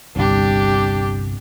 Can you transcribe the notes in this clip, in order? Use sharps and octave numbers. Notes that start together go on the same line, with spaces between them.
G1 C2 D4 G4